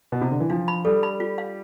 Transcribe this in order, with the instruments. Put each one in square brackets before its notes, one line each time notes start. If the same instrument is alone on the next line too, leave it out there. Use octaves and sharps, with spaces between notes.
[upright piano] B2
C3
D3
E3
[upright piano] F3 [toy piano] D4
[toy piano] B5
[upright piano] G3 [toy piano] A4
[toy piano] B5
F4
F5